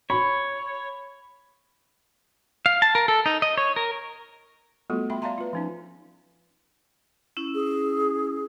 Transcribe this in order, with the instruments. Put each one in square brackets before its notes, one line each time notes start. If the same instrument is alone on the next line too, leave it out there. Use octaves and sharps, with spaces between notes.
[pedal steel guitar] C#5 [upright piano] B5
[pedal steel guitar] F5
A5
A#4
A4
D#4
D#5
C#5
A#4
[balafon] G3 A3 B3 F4 F#4 A4
E5 G5 B5 C6
D5 E5 F5 A5 A#5 C6
F4 B4
F3 C#4 D#4
[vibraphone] C#4 E4 E6
[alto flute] G#4